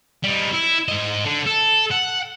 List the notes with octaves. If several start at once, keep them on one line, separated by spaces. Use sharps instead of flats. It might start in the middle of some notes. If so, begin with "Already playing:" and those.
G3 D#4
E4
G#2 D#5
D3
A4
F#5